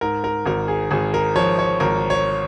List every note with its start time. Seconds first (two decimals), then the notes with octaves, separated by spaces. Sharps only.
0.01 G#2 A#4
0.24 A#4
0.46 G#1 A#4
0.68 G#4
0.91 G#1 G#4
1.14 A#4
1.36 F3 C#5
1.59 C#5
1.80 G#1 A#4
2.10 C#5